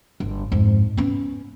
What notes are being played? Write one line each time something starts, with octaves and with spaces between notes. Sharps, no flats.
G1
F2 G#2
B3 C#4